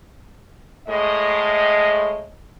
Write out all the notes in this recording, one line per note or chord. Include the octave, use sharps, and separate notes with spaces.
A2 G#3 D#5